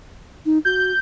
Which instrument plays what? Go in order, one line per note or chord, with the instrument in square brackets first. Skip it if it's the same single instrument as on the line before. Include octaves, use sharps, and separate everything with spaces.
[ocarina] D#4
[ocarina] F#4 [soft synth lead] G6